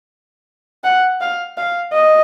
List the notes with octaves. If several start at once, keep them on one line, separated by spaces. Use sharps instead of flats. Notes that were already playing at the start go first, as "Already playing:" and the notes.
F#5
F5
F5
D#5